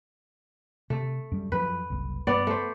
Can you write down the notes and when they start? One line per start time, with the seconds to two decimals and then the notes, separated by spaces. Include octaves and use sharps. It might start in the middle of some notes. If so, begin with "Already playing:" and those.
0.90 C3 A3
1.32 F#2 G3
1.52 F#2 F3 B4
1.90 F#1 C2
2.27 G2 B3 D5
2.47 A3 C5